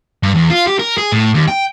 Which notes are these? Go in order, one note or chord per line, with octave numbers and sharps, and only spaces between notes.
G2
E2
F4
G4
A#4
G#4
A2
D#2
G5